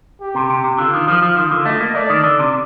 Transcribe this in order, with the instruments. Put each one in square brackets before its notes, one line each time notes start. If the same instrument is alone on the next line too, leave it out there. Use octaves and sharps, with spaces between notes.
[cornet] G4
[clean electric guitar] C3
C3
C3
[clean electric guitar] D3 [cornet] F4
[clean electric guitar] D#3
F3
F3
[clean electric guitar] D#3 [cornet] F4
[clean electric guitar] D3
[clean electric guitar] A3 [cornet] D#5
[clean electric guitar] A#3
[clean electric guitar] A3 [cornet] D5
[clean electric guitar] D#3
D3
C3